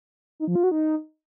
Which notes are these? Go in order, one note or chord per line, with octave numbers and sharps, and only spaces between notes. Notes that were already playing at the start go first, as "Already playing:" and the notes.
D#4
F3
F4
F#4
D#4